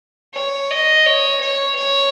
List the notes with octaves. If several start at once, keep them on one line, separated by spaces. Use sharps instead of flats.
C#5
D#5
C#5
C#5
C#5